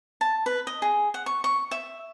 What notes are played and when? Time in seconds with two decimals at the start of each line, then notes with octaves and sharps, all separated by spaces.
0.21 A5
0.46 B4
0.67 D#5
0.82 G#4
1.14 F#5
1.26 C#6
1.44 C#6
1.71 E5